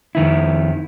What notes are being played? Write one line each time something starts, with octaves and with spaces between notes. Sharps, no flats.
F2 D#3 E4